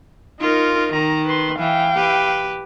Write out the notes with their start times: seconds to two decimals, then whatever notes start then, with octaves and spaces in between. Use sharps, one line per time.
0.40 D#4 F4 A#4
0.93 D#3 A#5
1.25 B4 C6
1.59 E3 F5 G5
1.94 G4 B4